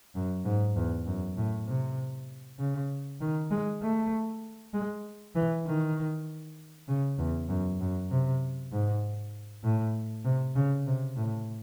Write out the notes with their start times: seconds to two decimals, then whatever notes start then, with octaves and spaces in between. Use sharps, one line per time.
0.15 F#2
0.45 G#2
0.76 E2
1.07 F#2
1.37 A2
1.67 C3
2.59 C#3
3.21 D#3
3.51 G#3
3.82 A3
4.74 G#3
5.35 E3
5.66 D#3
6.88 C#3
7.19 E2
7.49 F#2
7.81 F#2
8.11 C3
8.72 G#2
9.64 A2
10.24 C3
10.55 C#3
10.86 C3
11.17 A2